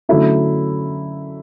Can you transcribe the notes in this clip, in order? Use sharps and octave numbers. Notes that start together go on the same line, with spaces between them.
D3 F#3 A3 C#4 E4